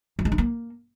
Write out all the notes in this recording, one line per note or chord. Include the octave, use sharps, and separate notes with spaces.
F#3
G#3
D#4
A#3